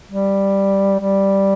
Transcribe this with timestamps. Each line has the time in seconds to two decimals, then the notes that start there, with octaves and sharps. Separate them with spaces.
0.12 G3
0.99 G3